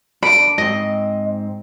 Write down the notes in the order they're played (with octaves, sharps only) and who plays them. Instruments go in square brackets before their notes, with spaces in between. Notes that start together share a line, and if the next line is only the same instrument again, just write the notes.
[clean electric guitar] D4 [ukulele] B5 [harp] D7
[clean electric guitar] G#2 C4 [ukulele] D#5